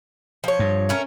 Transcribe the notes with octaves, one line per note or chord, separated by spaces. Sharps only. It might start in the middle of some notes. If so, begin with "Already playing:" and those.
F3 C#5
G2
A3 C#4 A#4